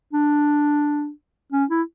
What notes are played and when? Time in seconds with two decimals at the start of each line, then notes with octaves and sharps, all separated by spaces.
0.13 D4
1.52 C#4
1.70 E4